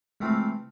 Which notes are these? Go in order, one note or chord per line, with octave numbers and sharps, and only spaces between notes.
E3 G#3 A3 C4 F4